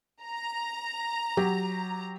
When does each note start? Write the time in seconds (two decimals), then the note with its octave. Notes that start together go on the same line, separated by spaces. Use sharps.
0.22 A#5
1.37 F#3 G4